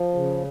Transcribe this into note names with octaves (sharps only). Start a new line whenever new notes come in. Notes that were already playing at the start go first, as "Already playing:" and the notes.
Already playing: F3
C#3